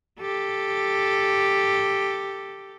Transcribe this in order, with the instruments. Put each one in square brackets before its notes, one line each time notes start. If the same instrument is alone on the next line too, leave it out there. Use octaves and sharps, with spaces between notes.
[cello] G4 A4